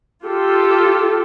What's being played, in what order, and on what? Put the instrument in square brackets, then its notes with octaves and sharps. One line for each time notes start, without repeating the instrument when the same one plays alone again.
[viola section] F4 G4 A4